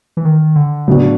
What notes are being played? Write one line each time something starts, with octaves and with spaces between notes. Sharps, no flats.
E3
D#3
D3
A2 C#3 F#3 B3 D4 F#4